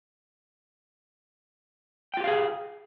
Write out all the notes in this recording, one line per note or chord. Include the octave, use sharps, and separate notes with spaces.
F4 G4 G#4 F5 G5